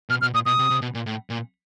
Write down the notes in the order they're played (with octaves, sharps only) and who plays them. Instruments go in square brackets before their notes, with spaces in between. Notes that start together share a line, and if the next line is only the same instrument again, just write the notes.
[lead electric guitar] B2 [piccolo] F6
[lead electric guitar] B2 [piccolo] F6
[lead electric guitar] A#2 [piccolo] D#6
[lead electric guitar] B2 [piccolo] D#6
[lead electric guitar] C3
C3
B2
A#2
A2
A#2